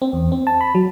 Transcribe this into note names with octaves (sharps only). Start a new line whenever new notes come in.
C4
E2
C4
A5
B5
F#3